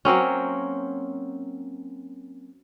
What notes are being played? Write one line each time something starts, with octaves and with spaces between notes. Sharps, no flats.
F#3 A#3 C4 C#4